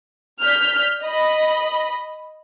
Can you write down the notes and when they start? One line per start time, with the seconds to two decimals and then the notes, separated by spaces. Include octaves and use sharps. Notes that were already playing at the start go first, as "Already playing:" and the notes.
0.41 D5 F6 G6 B6
1.03 D#5 B5